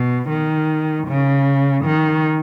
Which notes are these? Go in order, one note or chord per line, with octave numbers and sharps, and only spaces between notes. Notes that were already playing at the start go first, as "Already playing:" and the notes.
Already playing: B2
D#3
C#3
D#3